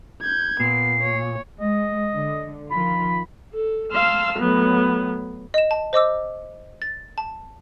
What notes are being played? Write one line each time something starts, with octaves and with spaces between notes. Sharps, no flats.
G6 G#6
A#2 B3 C7
C#5
G#3 D#5
D3
D#3 F3 F4 B5
A4
F5 A5 C6 E6 F6
A2 F#3 B3
D#5 E7
A5
C5 D#5 D6 E6
A6
A5